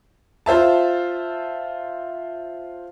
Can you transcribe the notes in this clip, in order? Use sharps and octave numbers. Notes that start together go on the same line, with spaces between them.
F4 C5 E5 A5